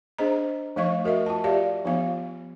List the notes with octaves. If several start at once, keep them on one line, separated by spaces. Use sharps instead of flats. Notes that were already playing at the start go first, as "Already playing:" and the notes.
D4 G#4 C5 D#5 A#5
F3 A3 D#5 F5 C#6
F#4 A#4 D#5 E5
F4 A5
G4 D5 E5 F5
F3 B3 F4 F5